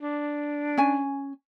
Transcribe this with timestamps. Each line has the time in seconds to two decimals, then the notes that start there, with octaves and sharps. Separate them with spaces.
0.01 D4
0.78 C#4 G#5